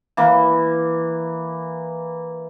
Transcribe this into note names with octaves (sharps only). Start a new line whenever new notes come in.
E3 A#3